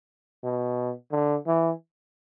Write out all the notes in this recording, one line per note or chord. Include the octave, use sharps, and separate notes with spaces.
B2
D3
E3